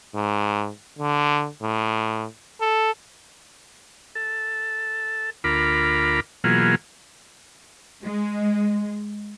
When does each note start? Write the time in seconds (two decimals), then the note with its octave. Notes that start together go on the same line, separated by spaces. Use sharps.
0.15 G#2
0.99 D3
1.62 A2
2.61 A4
4.15 A4
5.44 D2 F4 A#4 B5 D6
6.44 B2 E3 F#3 A#3 F4 G#4
8.03 G#3